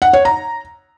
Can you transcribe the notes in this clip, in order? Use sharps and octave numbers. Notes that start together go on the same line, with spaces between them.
F#5
C#5
A#5